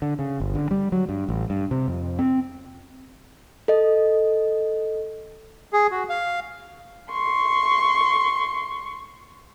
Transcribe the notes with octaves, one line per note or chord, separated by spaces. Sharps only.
D3
C#3
G1
D3
G3
F#3
G2
A1
G2
C3
F2
C4
A4 D#5
G#4
F#4
F5
C6 C#6